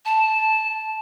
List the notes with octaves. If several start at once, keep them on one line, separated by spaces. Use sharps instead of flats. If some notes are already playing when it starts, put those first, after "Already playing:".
A5